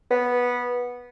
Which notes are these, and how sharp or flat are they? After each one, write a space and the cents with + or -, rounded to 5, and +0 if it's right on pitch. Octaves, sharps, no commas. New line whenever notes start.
B3 -10